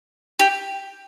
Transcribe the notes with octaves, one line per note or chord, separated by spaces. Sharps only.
G4